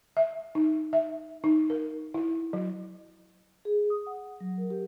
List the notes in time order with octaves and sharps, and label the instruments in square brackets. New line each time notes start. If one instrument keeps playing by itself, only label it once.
[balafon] E5
D#4
E5
D#4
A#4
E4
F#3
[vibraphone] G#4
D#6
F#5
F#3
A#4
G4